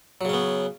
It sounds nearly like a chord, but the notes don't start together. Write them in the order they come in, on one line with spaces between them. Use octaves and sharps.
F#3 C#3 C#4 B3